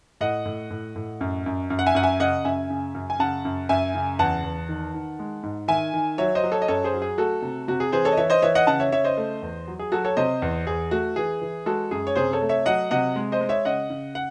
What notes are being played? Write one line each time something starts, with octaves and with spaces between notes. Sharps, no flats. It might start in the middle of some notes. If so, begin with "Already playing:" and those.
A2 D#5 F#5
A2
A2
A2
F#2
F#2
F#2
F#5
E5 G#5
F#2 F#5
E5 G#5
C#3 D#5 F#5
F#2 E5 G#5
C#3
F#2
G#5
C#3 F#5 A5
F#2
F#2 E5 G#5
C#3
E2 F#5 A5
E2
D#3
D#3
G#3
G#2
D#3 E5 G#5
D#3
F#3 C#5 E5
C5 D#5
F#3
A4 C#5
D#5
F#2 A4 C#5
G#4 C5
F#3
G#4
A3 F#4 A4
C3
C3 F#4
G#4
E3 G#4 C5
A4 C#5
D#5
E3 C#5 E5
C5 D#5
E3 C#5 E5
D#5 F#5
C#3 F#5 A5
C#5 E5
C#3 C#5 E5
C5 D#5
A3
E2
F#3
G#4
F#3 F#4 A4
A4 C#5
C3 C5 D#5
E2
E2 G#4
A3 F#4
E3 G#4
E3
G#3 F#4 A4
F#2 G#4
C#5
C3 G#4 C5
A4 C#5
A3
C#5 E5
F#3 D#5 F#5
C3 D#5 F#5
G#3
C5 D#5
G#3
C#5 E5
C#3 D#5 F#5
C#3
F#5